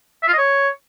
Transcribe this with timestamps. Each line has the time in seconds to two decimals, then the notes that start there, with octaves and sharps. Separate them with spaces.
0.23 E5
0.28 F4
0.33 D#5
0.38 C#5